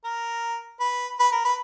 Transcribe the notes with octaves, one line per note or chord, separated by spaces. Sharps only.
A#4
B4
B4
A#4
B4